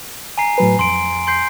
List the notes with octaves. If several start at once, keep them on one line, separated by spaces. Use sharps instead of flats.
G#5 A#5 C7
A2 F#3 B4
F2 C6 D7
C6 G6 C7